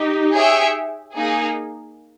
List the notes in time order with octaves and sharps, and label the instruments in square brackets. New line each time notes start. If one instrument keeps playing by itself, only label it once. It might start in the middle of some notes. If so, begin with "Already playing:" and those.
Already playing: [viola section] D#4 G4
[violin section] G#4 C#5 E5 G5
A#3 D#4 G#4